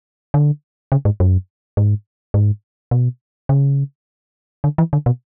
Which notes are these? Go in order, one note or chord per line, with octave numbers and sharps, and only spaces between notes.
D3
C#3
G#2
F#2
G#2
G#2
B2
C#3
D3
E3
D3
B2